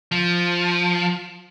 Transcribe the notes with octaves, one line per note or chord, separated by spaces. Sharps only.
F3